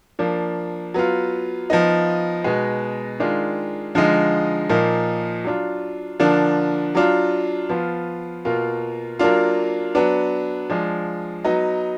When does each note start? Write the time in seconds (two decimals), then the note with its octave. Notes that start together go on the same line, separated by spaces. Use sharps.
0.19 F3 A#3 D4
0.94 F#3 B3 F4
1.70 F3 B3 D#4
2.44 B2 G#3 B3 D#4
3.20 D#3 G#3 D4 F4
3.95 D3 F3 G#3 D#4
4.69 A#2 F3 A#3 D#4
5.44 F#3 D4 F4
6.20 D3 F3 A#3 D4
6.95 F#3 D4 F4
7.69 F3 B3 F4
8.45 B2 A#3 F4
9.19 F#3 A#3 D4 F4
9.95 F#3 B3 D4
10.70 F3 G#3 D4
11.45 F#3 B3 D#4